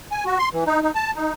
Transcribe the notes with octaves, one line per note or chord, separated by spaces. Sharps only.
G#5
F#4
C6
E3
D#4
D#4
A5
D#4